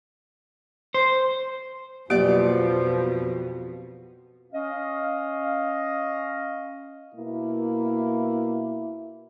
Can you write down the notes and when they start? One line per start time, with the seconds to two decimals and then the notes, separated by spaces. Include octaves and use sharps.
0.94 C5
2.10 F2 B2 F3 F#3 A#3 B3 G4 D5
4.53 C#4 D#5 F5
7.14 B2 A#3 E4